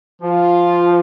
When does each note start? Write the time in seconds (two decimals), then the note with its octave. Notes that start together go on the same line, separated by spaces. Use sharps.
0.22 F3 F4